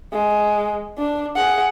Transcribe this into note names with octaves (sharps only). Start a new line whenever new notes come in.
G#3
D4
G#4 F#5